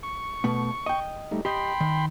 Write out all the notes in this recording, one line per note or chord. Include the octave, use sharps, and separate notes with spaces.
C#6
B2 A3 B3
D#5 G5
G3 A3 D#4
G4 D#5 G5 B5 C6
D#3